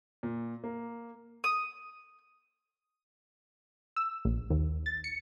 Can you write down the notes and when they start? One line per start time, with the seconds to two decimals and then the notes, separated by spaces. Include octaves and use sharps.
0.23 A#2
0.64 A#3
1.44 D#6
3.96 E6
4.25 A#1
4.50 D#2
4.86 A6
5.04 C#7